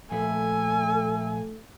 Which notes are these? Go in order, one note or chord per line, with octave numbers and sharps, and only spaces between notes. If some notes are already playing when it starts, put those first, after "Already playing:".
A#2 F3 A3 A4 B4 G#5